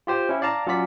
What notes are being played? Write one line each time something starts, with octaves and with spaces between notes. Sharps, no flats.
F4 G4 C5
C#4 E4
D5 F5 A5 A#5
F#3 C#4 F4 D5 B6